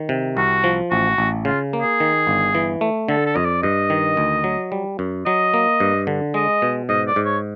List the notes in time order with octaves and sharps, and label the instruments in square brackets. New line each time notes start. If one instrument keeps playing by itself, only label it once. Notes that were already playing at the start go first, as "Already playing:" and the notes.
Already playing: [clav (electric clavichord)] D#3
C3
[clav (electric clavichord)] C2 [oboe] F#4
[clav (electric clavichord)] F3
[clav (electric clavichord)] A1 [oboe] F#4
[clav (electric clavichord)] A1
[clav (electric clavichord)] C#3 [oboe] F4
[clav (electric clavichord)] A#3
[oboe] G#4
[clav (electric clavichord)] D#3
G1
E3
A3
[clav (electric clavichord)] D3 [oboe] A4
[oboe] A4
[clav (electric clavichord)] F2 [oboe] D#5
[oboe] D5
[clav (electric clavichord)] G2 [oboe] D#5
[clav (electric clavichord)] D#3
D2
F#3
G3
F#2
[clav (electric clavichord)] F#3 [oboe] D#5
[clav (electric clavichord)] A#3
G2
D3
[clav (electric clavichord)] G#3 [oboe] D#5
[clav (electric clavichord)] B2
[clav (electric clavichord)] G#2 [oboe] D#5
[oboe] D5
[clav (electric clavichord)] G#2
[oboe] C#5